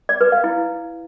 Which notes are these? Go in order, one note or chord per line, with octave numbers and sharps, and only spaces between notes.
D5
B4
F5
E4